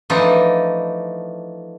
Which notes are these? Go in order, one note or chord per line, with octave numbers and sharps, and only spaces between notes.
E3 F3 A3 D4 D#4